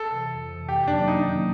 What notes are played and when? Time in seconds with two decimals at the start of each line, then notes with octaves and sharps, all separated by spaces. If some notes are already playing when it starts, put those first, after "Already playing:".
Already playing: A4
0.11 C3 E3
0.30 F2
0.49 C3 E3
0.68 F#2 G4
0.88 D#3 F#3 A#3 C#4 D4
1.08 F#2 D#4
1.26 D#3 F#3 A#3 C#4